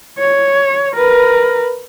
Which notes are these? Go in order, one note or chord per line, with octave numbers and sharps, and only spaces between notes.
C#5
A#4 B4